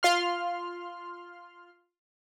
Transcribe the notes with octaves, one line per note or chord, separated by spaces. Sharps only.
F4 C6 F6